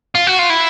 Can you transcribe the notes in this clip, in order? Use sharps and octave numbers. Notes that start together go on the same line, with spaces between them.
F4
F#4
F4
E4